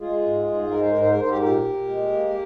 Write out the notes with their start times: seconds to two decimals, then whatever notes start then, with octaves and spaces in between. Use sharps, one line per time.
0.01 G#3 F4 G#4
0.24 G#2
0.48 G#2
0.71 G#3 A#4
0.81 C5
0.91 G#2 A#4
1.01 C5
1.11 A#4
1.18 G#2 C5
1.30 G4 A#4
1.41 A#2 G4 A#4
1.65 A#2
1.89 G#3
2.12 A#3